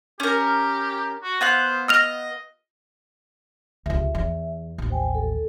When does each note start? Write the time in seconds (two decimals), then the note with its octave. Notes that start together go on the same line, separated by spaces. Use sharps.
0.20 C#4 G4 A#4
1.23 F#4
1.41 B3 C5 F5 F#6
1.88 D#5 E6 F6 F7
3.86 C#2 C3 E5
4.15 E2
4.78 A1 D#2
4.90 C5 G5 G#5
5.15 A4